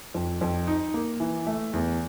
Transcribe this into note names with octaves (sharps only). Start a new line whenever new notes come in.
F2
F2
D#4
A#3
E3
A3
E2